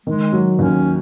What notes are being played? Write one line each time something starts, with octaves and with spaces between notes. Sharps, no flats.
D#3 G#3
F#3
D#2 C#4